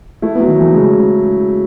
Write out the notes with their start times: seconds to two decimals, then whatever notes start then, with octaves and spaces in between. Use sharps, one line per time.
0.22 A3 E4
0.35 F#3 B3
0.48 D#3
0.57 E3 A3
0.74 C#3 G#3